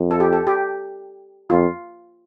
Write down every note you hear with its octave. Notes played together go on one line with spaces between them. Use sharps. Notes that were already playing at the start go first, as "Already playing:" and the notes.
Already playing: F2
A4
G4
A4
G4
F2 F4